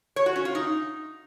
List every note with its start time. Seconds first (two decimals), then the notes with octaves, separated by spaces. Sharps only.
0.16 C#5
0.26 F#4
0.36 C#4
0.45 F4
0.55 D#4